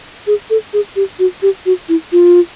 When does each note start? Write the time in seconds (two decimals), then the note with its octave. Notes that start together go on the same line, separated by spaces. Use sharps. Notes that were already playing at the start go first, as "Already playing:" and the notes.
0.27 G#4
0.50 A4
0.73 G#4
0.96 G4
1.19 F#4
1.42 G4
1.66 F#4
1.89 E4
2.12 F4